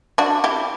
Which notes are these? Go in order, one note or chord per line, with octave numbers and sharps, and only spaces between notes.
D4 F#4
E4 G4